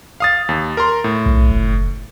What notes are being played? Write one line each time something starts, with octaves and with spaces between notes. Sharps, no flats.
F5 D#6 A6
D#2
A#4 A#5 C6
A2
B1
F#1